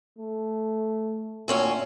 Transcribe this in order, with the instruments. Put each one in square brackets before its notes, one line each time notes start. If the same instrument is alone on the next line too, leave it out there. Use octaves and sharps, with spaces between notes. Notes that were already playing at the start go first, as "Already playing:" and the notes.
[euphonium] A3
[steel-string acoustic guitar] D2 C4 C#4 [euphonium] A#2